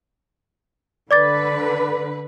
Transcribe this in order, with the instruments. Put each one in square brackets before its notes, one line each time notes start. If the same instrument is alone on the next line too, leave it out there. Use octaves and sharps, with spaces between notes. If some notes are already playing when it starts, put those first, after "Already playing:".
[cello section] D3 B4 [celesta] D5 D6 A6